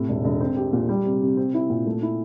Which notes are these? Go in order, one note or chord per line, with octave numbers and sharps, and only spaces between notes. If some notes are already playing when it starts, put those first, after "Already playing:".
Already playing: A2 C3
E1
E1
C4
G4
A#2
G3
C3
C3
C4
E4
A#2
A3
E4